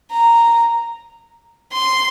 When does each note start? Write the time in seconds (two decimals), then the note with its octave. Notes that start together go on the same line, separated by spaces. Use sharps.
0.11 A#5
1.72 C6